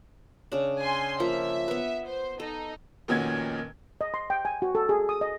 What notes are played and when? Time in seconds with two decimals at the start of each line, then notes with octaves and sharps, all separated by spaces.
0.52 C#3 D4
0.81 G#5 C6
1.20 F3 A#3 E5
1.68 B3 B4
2.08 C5
2.40 D#4 A4
3.08 F1 A#2 D#3 C#4 F#4 G#6
4.01 D#5
4.14 C6
4.30 G5
4.45 G#5
4.62 F#4
4.75 A4
4.89 G#4
5.09 D#6
5.21 D#5